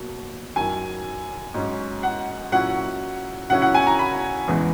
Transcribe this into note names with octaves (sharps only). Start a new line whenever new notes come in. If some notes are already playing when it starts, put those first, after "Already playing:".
Already playing: B2 F#3 A#3
F#2 D#3 F#3 G#5
G#2 F#3 C#4
F#5
A#2 F#3 C#4 E4 F#5
C#3 F#3 C#4 E4 F#5
F#5
G#5
A#5
B5
E2 C#3 E3 G#3